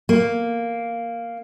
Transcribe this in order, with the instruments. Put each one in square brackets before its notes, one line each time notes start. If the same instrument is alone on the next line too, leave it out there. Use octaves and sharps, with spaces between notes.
[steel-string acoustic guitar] A#3